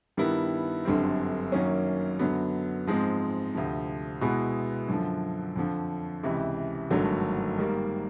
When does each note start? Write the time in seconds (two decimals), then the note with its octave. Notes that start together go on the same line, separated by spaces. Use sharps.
0.17 G2 D#3 G3 B3 E4
0.85 G1 F#2 D3 G3 C4
1.52 F#2 D#3 F#3 A#3 C#4
2.19 F#2 D3 F#3 B3
2.87 G#2 F3 G#3 C4
3.55 D2 C3 F3
4.21 B2 G#3 B3 E4 G#4
4.88 F#2 D3 F3
5.56 F2 D3 F3
6.23 C#2 C3 E3
6.90 G#1 G2 D3 F#3 A3
7.58 G#2 D#3 G3 A#3